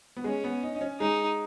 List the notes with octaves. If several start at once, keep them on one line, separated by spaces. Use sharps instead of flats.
B3
G#3 C#4
B3
D#4
D#4
C#4
G#3 D#4